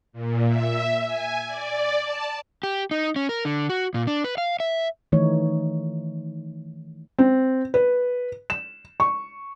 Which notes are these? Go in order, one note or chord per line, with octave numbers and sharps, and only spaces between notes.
A#2
E5
G#5
D5
A5
G4
D#4
C#4
A#4
D3
F#4
A#2
D4
B4
F5
E5
D#3 E3 A3 D#4 C#5
C4
B4
E7
C#6